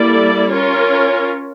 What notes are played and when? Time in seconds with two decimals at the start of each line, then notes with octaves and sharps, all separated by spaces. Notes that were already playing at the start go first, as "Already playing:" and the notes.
Already playing: G3 A#3 E4 A4 D5
0.51 C#4 F4 A#4 C#5